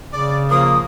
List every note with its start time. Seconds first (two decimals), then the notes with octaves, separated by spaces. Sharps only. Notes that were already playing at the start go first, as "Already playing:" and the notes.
0.12 C#3 D5
0.50 F3 A#3 D#6